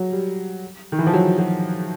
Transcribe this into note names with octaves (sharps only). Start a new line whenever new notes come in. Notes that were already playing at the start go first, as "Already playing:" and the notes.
Already playing: F#3
G3
D#3
E3
F3
F#3
F#3